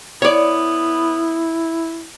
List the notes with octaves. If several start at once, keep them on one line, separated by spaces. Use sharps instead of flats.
B3 E4 C#5 D5